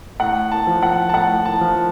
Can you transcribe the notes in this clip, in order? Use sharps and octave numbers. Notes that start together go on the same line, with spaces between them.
A2 F#5
A5
F3
F#5
A5
A2 F#5
A5
F3